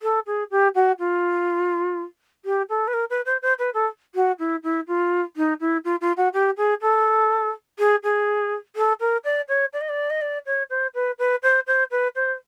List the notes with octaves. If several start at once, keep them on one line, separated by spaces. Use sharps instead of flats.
A4
G#4
G4
F#4
F4
G4
A4
B4
A#4
B4
C5
C5
B4
A4
F#4
E4
E4
F4
D#4
E4
F4
F4
F#4
G4
G#4
A4
G#4
G#4
A4
A#4
D5
C#5
D5
D#5
D5
D#5
D5
C#5
C5
B4
B4
C5
C5
B4
C5